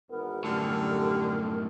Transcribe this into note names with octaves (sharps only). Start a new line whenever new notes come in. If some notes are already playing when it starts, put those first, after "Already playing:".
G#1 E2 B3 A#4
F#2 A2 D3 G3 G4 A4